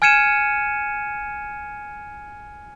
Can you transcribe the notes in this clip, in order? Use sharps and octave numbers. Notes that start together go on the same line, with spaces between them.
G#5 F6 G#6 C#7 D#7 E7